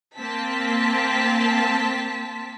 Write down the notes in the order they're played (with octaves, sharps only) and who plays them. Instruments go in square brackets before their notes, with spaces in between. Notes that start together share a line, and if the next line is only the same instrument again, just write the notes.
[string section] A#3 C4 A5 B6